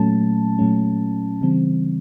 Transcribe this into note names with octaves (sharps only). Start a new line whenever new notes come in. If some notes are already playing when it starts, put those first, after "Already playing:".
Already playing: A#2 F#3 A3 C#4 A5
A#2 F#3 A3 C#4
C#3 E3 G3 C4